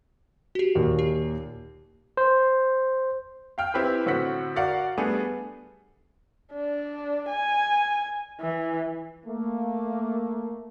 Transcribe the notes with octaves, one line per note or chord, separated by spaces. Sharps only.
F#4 G4
D#2 A#2
G4
C5
F5 G5 F6
C4 E4 G4 B4
A2 D3 C4 F#4 F#5 B6
F#4 A#4 D5 F5 F#5
G3 A3 B3 D4 G#4
D4
G#5
E3
A3 A#3